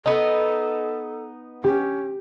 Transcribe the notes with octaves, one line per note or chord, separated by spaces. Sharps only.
B3 D#4 A4
C#4 G4